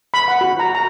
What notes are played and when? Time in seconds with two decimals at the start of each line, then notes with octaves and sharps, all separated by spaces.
0.14 B5
0.28 F#5
0.41 F#4
0.60 A#5
0.75 A#5